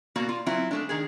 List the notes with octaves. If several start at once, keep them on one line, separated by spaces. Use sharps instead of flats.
B2 A#3 F#4 D5
F4
F#3 C4 E4 F4
G#3 A3 D4
D#3 D4 G#4